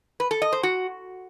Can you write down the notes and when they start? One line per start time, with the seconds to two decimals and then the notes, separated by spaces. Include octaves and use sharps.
0.20 B4
0.31 A4
0.42 D#5
0.52 C5
0.63 F#4